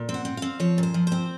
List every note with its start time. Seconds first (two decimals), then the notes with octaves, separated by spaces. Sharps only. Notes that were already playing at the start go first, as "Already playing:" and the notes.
Already playing: A#2
0.09 C4
0.14 F#5
0.25 C4
0.37 C4 F5
0.60 F3 C#5
0.78 A#2
0.83 C5
0.94 F3
1.07 C4 C5